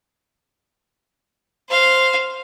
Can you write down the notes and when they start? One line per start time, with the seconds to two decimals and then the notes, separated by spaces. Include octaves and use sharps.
1.69 C5 F5